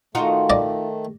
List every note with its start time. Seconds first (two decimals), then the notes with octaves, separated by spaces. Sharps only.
0.15 D#3 A3 D#4 F4 F#4
0.50 D5 D#5